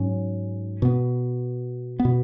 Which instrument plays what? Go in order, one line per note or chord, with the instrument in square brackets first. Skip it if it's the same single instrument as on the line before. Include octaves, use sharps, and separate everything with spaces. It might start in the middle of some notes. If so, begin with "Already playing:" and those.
Already playing: [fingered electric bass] G#2 F#3 C#4
B2 B3
B3
B2